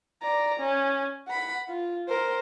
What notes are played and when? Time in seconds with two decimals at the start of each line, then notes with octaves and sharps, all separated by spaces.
0.22 D5 A#5
0.60 C#4
1.28 F#5 B5
1.68 F4
2.09 A#4 C5